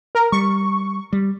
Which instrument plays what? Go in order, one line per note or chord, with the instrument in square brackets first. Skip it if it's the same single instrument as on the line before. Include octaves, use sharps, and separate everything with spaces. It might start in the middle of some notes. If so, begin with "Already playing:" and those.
[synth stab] A#4
[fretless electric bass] G3 [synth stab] C#6
[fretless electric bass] G3